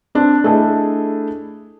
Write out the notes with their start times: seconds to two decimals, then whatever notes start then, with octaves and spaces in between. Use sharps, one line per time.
0.15 C4 D4
0.44 A3 D4 E4 G#4 A4 D#5